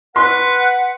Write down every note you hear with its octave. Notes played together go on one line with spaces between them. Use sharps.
B4 F#5 C6